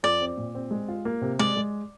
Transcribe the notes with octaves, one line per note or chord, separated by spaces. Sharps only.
F2 D5
C4
A#2
C4
G#3
F4
A#3
C3
G#3 D5
G#3